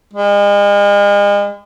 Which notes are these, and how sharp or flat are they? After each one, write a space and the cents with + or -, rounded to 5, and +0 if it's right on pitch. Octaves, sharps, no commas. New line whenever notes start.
G#3 -40